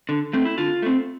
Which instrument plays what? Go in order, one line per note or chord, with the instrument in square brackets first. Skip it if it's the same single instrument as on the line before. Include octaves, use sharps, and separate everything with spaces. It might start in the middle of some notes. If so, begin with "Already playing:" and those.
[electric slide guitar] D3
A3 C4
E4
D3 F4
A3 C4